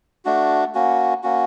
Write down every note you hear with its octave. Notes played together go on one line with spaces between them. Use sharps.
A3 D4 F#4
A#3 C#4 F#4
A#3 C#4 F#4